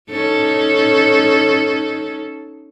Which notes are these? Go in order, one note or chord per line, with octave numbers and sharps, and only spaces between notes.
C#4 D#4 A4